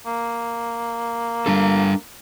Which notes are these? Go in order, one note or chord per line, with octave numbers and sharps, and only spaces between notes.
A#3
G3 D4 A4